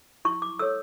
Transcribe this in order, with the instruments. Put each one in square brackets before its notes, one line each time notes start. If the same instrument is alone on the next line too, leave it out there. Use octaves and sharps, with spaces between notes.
[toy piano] E4 C#6
D6
A4 C#5 E6